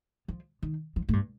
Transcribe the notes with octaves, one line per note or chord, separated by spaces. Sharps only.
F3
D#3
F3
A2
G2